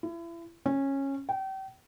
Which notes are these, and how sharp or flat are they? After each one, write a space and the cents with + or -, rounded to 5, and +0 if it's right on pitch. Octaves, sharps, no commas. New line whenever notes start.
E4 +35
C#4 -15
G5 -35